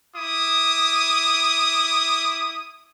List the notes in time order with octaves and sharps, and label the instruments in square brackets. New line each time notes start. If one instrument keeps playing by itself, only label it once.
[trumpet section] E4 D6 D#6